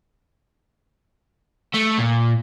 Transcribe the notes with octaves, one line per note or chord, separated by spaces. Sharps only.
A3
A#2